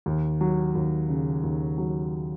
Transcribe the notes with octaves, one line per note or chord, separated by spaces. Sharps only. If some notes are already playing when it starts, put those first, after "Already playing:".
D#2
F#3
D#2
C#3
D#2
F#3